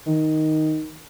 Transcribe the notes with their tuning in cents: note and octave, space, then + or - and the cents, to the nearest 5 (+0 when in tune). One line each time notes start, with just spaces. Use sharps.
D#3 +0